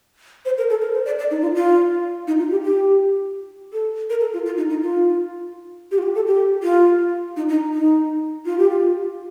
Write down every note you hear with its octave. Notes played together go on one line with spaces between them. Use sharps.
C5
A#4
A4
A#4
C5
D5
D5
D#4
F4
F4
D#4
F4
G4
G4
A4
A#4
A4
F4
F4
D#4
D#4
F4
G4
F4
G4
A4
G4
F4
D#4
D#4
D#4
F4
G4
F4